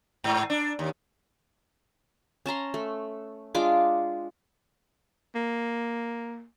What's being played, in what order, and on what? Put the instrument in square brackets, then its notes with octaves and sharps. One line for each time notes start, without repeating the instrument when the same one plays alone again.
[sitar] G#2
D4
D#2
[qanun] C#4 A5 A#5 C6
A3
G#3 D4 F4 D6
[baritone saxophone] A#3